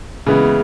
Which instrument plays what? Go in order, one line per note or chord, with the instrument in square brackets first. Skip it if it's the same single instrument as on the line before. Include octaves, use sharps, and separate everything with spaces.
[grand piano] C#3 E3 G#3 B3